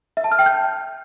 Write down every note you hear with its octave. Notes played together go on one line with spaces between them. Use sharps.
E5
A5
F6
G5
G6